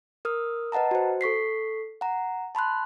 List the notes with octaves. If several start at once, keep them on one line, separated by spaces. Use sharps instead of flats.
A#4 D#6 F6
B4 D#5 F#5 A5 A#5
F#4 C5
A4 C#6 B6 C7
F#5 A#5
A5 B5 C6 F#6